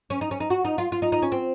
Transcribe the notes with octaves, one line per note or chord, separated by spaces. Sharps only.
C#4
D#4
C#4
D#4
F#4
D#4
F4
F4
D#4
D#4
C#4
C4